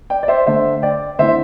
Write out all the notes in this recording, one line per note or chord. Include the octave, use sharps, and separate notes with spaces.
D5 G5
D5
C5 E5
D3 A3 D4 C5 E5
D5 G5
D3 A3 C4 E4 C5 E5